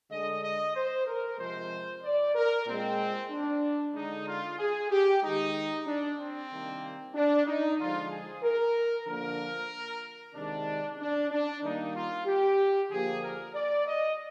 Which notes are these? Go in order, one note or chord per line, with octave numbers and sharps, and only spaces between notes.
D3 G#3 D#5
D#5
C5
A#4
C3 F3 G#3 C5
D5
A#4
A#2 G#3 C4
D4
D3 G#3 D#4
F4
G#4
G4
D#3 G#3 D#4
D4
C4
C3 D#3 G3 A#3
D4
D#4
D3 F3 G#3 F4
G#4
A#4
D3 F3 A#3 A#4
C3 D#3 G#3 D4
D4
D4
D#3 G3 A#3 D#4
F4
G4
D3 F3 A#3 G#4
A#4
D5
D#5